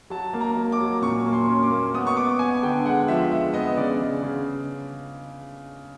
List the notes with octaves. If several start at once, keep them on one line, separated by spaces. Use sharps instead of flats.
F#3 A5
A#3
A#5
A#3
D6
F#3
A#2 C#6
A#3
C6
C#4
D6
A#3
B3 D#6
C#6
B3 D6
B3 G#5
D3 G5
G#3 F#5
F3 E5
G#3 E5
B3 D#5
C#3 D5
C#3
C#3